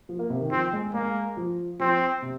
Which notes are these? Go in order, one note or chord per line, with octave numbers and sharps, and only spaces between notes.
F3
A#3
C3
D#3
F3 C4
G#3
G#3 A#3
F3
F3 C4
C3